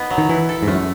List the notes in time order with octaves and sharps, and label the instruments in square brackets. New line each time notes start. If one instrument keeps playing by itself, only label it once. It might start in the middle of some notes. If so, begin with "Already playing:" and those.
Already playing: [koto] B3 D#4
F#3
[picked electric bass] D#3
[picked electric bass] E3 [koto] E4
[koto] A4
[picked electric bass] G#2
[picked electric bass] F#2 [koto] A3